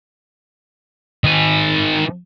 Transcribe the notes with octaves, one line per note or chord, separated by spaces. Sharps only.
D#3 G#5